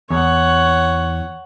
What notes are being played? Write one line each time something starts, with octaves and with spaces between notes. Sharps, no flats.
E2 C#5 F#5